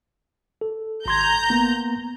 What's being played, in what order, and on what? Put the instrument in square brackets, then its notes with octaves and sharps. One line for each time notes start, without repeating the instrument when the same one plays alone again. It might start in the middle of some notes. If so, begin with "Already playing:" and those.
[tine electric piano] A4
[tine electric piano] G#1 C6 G#6 [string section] A#5 G6
[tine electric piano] A#3 B3